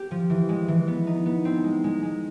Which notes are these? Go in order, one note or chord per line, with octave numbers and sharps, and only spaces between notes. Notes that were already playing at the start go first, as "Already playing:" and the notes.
Already playing: C4 G4
F3
E3
G#3
E3
B3
D#4
B3
C4
G#3
G#3
G#3